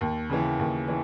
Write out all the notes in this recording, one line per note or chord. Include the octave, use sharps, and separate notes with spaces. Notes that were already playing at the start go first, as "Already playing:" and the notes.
D#2
C#3 E3
D#2
E3